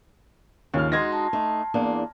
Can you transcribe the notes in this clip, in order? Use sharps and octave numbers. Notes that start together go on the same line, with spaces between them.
D#2 C#3 F3 F6
G#3 D#4 F#4 C6 G#6 A#6
A5
A3 D#4
E2 A#3 D4